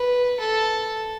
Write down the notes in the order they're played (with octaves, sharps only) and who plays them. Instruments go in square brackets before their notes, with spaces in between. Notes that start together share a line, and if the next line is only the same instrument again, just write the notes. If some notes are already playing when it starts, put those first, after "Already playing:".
Already playing: [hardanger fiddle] B4
A4